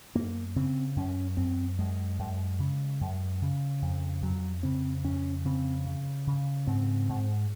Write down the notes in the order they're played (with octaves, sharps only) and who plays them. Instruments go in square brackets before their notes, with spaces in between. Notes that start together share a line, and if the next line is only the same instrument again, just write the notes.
[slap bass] F#2 A#3
C#3 C4
F#2 C#4
F#2 C4
F#2 G#3
F#2
C#3
F#2
C#3
F2
F2 F#3
C#3 C4
F2 C#4
C#3 C4
C#3
C#3
G#2 C4
G#2